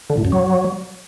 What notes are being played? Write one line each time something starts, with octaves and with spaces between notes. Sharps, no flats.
D3
A2
F#2
F#3